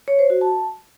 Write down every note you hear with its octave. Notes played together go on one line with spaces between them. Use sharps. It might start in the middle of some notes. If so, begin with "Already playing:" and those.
C#5
C5
F#4
A5